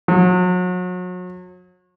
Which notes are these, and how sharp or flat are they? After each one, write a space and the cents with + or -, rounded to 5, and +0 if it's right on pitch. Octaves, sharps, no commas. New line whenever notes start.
F#3 -35